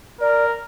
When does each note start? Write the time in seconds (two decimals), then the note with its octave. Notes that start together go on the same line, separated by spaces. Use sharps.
0.21 A#4 D5